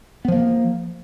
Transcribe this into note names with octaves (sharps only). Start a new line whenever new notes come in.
F3 A#3 B3